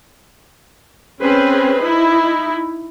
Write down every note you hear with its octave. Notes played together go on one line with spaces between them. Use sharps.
C4 C#4 G#4 B4 C5
D#4 E4